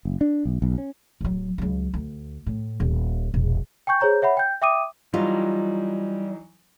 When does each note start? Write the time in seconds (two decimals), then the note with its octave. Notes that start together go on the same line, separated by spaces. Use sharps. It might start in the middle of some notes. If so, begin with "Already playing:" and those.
0.05 F#1
0.21 D4
0.45 B1
0.62 B1
0.78 C#4
1.21 D1 F#3
1.58 C#2 F#3
1.94 D2
2.46 A2
2.80 D#1
3.34 E1 A#1
3.87 G5 G#5 C#6 G6
4.00 G#4 C5 C#5 A#5 G6
4.22 C#5 E5 F#5 B5
4.37 G5 G6
4.62 E5 G5 D6 D#6 D#7
5.14 E3 F#3 G3 D#4 F4